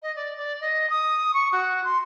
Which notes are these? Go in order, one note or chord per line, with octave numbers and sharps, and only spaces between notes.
D#5
D5
D5
D#5
D#6
C#6
F#4
C6